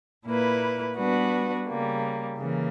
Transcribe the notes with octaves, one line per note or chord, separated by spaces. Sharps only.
A#2 A#3 E4 B4
G3 B3 D4 F#4 B4
C#3 G3 A#3
C#3 E3 A#3